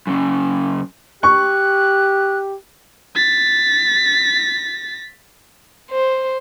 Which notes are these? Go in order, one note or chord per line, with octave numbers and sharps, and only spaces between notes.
F#2 C#3
G4 C#6 F#6
A6 B6
C5